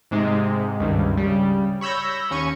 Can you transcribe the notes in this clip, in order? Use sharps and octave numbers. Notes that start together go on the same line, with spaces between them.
G#2 C3 G#3
C#2 G2 D#3
C#3 G3
C#5 B5 E6 G6 A#6
D#2 C#4 C#6 C#7 D#7